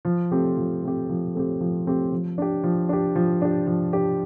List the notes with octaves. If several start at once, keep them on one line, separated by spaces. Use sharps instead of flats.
F3
A3 C4 G4
F3
A3 C4 G4
F3
A3 C4 G4
F3
A3 C4 G4
F3
D4 G4
F3
D4 G4
F3
D4 G4
F3
D4 G4